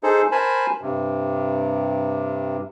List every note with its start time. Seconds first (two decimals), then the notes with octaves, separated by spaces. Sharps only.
0.03 D#4 G#4 A4 C5
0.32 A#4 C5 G#5 A5 B5
0.81 G2 C3